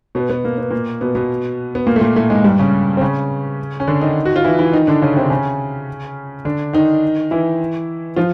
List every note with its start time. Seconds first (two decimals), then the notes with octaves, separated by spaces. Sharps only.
0.15 B2 B3
0.29 B2 B3
0.45 A#3
0.58 B3
0.70 A#2 A#3
1.01 B2 B3
1.15 B2 B3
1.75 B3
1.87 A#2 A#3
1.96 A3
2.01 A#2 A#3
2.16 A2 A3
2.30 G#2 G#3
2.44 G2 G3
2.59 C#3 C#4
2.97 C4
3.01 C#3 C#4
3.80 C#4
3.87 D3 D4
4.01 D#3 D#4
4.25 F#4
4.36 F4
4.44 E3 E4
4.59 E3 E4
4.73 D#3 D#4
4.87 D3 D4
5.02 C#3 C#4
5.16 C3 C4
5.30 C#3 C#4
6.45 D3 D4
6.73 D#3 D#4
7.31 E3 E4
8.16 F3 F4